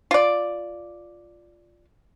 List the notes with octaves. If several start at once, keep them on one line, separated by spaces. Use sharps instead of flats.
F4 D5